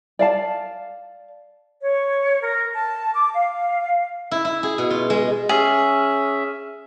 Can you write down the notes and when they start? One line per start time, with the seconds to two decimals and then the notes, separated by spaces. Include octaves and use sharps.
0.19 D5 F5 A5
1.83 C#5
2.43 A#4
2.74 A5
3.15 D6
3.34 F5
4.31 E4
4.45 E4
4.63 G#4
4.78 B2
4.90 F4
5.10 G#3
5.49 C#4 G#4 E5